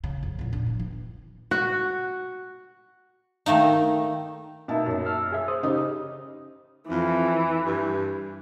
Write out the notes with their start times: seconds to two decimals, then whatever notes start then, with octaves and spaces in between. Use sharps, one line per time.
0.04 C#3
0.23 F2
0.39 E2 A#2
0.53 D4
0.67 F3 F#3
0.80 E3
1.51 F#4
3.46 D#3 A3 A#3 D#4
4.68 B2 A#3 D#4 E5 A5
4.86 F#2
5.04 A5 E6 F6
5.32 G#4 E5
5.48 C5 D#6
5.63 C#3 D#4 G4
6.90 F2 E3
7.65 G2